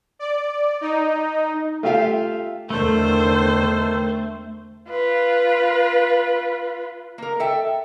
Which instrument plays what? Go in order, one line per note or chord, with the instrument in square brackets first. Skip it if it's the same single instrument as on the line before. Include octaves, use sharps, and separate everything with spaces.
[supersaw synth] D5
D#4
[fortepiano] A3 F4 G4 E5 F5 G5
[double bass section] E2 D3 [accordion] D#3 A4 [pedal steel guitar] A3 [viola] C5
[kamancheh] F4 B4
[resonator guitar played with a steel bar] A#3 A#4
A4 E5 G5